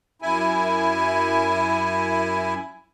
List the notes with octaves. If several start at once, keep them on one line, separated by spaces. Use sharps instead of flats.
F#2 E4 G#5